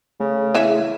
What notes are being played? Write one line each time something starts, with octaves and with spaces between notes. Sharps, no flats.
C#3 A3
E3 G#4 E5